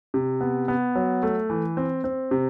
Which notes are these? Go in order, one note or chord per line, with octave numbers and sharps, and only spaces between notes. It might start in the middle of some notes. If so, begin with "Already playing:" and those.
C3
B3
B3
F#3
A3
E3
C4
C4
C3